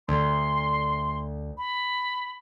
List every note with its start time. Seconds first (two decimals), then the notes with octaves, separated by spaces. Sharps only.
0.08 D2 C6
1.58 B5